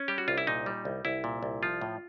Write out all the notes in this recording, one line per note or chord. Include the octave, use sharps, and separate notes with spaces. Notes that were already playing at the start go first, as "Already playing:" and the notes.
Already playing: C#4
G3 G4
F#4
C2 F4
E4
A#2 D#4
G3
C2
C2 E4
A#2
C2
F3 F4
A2